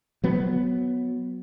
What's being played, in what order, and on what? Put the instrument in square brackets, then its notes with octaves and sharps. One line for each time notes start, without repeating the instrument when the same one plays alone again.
[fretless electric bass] F#3 B3